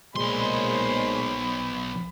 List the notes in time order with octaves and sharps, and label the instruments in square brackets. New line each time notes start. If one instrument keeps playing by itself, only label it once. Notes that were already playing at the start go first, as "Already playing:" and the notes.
[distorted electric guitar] B1 C6 [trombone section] A#2 G#3 [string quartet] C5 C#5 [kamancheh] B5